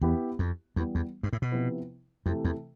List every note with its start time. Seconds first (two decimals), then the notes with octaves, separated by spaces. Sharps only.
0.02 E2 B3 E4 G4
0.39 F2
0.76 E2 E3 G3 B3
0.95 E2
1.23 G2
1.33 A2
1.42 B2
1.52 C3 F3 B3 E4 B4
2.26 F2 C3 E3 A3
2.44 E2